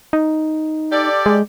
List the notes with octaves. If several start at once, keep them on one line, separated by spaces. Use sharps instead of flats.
D#4
G4 A4 D5
G#3